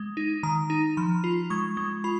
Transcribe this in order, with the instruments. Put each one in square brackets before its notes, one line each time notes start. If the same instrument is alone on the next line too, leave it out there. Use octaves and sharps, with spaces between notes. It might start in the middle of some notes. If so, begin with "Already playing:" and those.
Already playing: [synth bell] G#3
D#4
D#3 A#5
D#4
F3 B5
F4
G#3 C#6
G#3
F4 B5